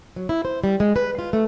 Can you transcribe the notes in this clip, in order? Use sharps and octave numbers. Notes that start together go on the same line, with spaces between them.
F#3
E4
C5
G3
G#3
B4
F4
A3